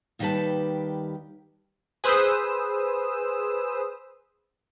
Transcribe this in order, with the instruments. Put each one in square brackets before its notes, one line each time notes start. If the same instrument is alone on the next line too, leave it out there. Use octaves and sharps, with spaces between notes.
[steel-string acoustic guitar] D#2 D#3 G3 G4 B4 A5
[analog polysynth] G#4 B4 C5 D#6 E6